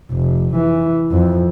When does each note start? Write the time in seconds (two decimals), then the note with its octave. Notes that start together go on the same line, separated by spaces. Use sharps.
0.12 F1
0.56 E3
1.11 F2